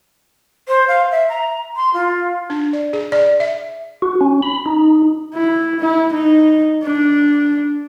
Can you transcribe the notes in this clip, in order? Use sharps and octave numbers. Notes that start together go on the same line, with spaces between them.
C5
F5
E5
A#5
C6
F4
D4
D5
G#4
D5
E5
F#4
C#4
B5
D#4
E4
E4
D#4
D4